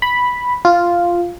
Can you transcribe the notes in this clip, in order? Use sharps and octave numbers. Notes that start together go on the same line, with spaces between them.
B5
F4